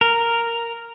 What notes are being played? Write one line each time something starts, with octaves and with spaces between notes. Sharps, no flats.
A#4